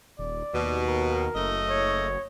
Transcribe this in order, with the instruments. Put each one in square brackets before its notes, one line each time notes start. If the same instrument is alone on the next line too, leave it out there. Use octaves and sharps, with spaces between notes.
[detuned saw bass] D#1 [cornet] D5
[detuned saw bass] D#2 [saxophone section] B2
[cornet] A#4
[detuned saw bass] F#1 [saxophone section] A3 D#5
[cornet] C#5